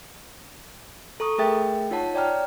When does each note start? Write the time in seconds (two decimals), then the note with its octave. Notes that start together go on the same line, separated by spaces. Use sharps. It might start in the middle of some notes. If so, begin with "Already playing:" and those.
1.20 A4 A#5 C#6 D#6
1.38 A3 G#4 A#4 E5 G5 A6
1.91 D#4 F4 C#5 F#5 A5
2.14 C#5 D5 G5 A#5 F6